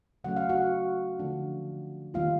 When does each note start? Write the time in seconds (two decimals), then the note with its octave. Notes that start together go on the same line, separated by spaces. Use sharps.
0.24 C#3 F#3 A3 C#4 F#5
0.37 F5
0.49 F#4 F#5
1.19 D3 F3 A3 D4
2.14 D#3 G3 A#3 D#4 F4 F5